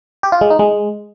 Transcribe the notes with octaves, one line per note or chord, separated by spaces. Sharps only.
G4
F4
G#3
D#4
G#3